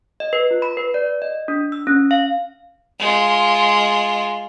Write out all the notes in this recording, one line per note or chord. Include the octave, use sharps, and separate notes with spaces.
D#5
B4
F4
B5
B4
D5
D#5
D4
E6
C#4
F5
G#3 F4